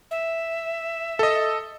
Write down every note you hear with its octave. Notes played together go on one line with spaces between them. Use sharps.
E5
A4 D#5